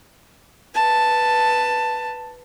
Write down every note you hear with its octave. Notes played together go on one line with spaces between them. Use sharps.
B4 A5